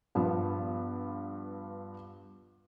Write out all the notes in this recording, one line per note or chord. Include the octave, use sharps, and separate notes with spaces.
G2 F3 B3